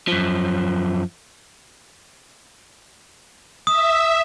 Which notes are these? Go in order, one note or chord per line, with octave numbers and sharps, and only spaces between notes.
F#2 F3
E5 D#6